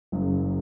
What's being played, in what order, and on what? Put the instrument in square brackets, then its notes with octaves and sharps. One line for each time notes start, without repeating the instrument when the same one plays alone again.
[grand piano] F#1 F#2 C#3